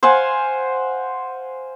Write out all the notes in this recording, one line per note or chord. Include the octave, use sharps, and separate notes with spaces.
C5 F5 F#5 G#5